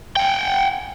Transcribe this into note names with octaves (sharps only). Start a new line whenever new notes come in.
F#5 G5